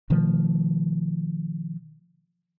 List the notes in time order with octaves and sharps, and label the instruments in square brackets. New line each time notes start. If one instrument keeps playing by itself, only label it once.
[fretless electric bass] B2 D#3 F3 A3